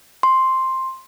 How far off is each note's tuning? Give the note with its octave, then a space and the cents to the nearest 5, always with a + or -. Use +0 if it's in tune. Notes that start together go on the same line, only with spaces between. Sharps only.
C6 +5